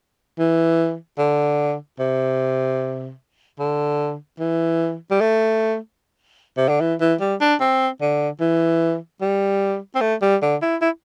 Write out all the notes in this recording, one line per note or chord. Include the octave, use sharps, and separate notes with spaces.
E3
D3
C3
D3
E3
G3
A3
C3
D3
E3
E3
G3
D4
C4
D3
E3
G3
C4
A3
G3
D3
E4
E4